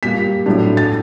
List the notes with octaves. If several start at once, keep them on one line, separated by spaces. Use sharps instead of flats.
A#2 G3 A#3 B6
A2 F#3 A3 D4
A6